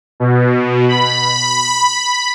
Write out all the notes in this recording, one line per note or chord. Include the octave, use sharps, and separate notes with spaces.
B2
B5